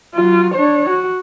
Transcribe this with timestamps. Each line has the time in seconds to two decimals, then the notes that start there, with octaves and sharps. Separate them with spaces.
0.15 F#3 F4
0.55 D4 C#5
0.90 F#4